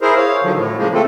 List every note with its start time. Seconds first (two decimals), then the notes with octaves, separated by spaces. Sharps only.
0.01 E4 G#4 A#4 C5
0.16 C#5 F5
0.43 D3 D#3 F3 F#3
0.55 A2
0.78 C#3 F3 G#3 A#3
0.94 A3 C4 F4 A4